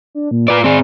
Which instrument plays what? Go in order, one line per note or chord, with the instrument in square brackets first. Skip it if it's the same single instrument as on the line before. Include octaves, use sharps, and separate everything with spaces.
[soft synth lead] D4
A#2
[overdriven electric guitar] F4 D5 [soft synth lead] B4
[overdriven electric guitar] C4 G#4 [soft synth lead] D5